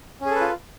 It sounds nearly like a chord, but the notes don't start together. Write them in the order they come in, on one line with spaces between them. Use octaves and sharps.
C#4 G#4 A4 B4 F4